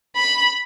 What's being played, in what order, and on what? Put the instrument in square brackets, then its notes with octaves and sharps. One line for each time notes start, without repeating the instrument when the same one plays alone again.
[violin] B5